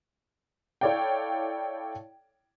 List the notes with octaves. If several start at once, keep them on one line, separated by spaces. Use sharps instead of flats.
E4 A4 C#5 D5 F5 G5